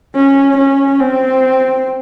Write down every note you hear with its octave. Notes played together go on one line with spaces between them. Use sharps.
C#4
C#4
C4